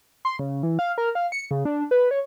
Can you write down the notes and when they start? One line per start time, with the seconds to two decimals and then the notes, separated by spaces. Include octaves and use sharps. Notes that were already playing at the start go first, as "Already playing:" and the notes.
0.25 C6
0.39 C#3
0.63 E3
0.79 F5
0.98 A#4
1.15 F5
1.32 C#7
1.51 C#3
1.65 D4
1.91 B4
2.11 C#5